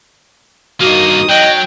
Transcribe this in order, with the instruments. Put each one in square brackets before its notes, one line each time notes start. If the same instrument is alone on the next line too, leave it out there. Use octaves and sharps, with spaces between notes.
[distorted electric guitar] G2 A#3 [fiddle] D#4 D#6 [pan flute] F#4
[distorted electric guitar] F#3 [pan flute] D#5 [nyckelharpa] G5